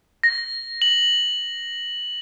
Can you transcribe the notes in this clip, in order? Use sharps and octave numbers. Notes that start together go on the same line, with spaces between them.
A#6
F#7